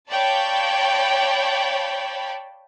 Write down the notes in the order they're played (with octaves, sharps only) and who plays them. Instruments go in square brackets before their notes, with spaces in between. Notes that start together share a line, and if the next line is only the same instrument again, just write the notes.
[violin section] C#5 D5 F5 G5 A5 B5